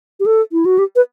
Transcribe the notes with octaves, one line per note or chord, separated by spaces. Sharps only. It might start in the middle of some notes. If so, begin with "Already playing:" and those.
G4
A4
E4
F#4
G4
B4